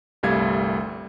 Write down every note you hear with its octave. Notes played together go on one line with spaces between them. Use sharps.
G1 C2 G3 A3 F5 G#6